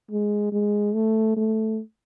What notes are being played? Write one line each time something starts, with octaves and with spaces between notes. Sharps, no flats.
G#3
G#3
A3
A3